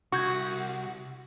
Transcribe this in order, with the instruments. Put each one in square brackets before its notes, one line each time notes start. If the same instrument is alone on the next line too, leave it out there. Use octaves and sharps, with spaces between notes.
[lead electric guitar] C2 [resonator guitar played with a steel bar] F#4 [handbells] C#6 G6 G#6